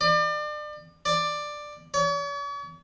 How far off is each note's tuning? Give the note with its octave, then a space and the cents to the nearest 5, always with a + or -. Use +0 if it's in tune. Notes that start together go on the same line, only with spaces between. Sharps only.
D5 +35
D5 +10
C#5 +45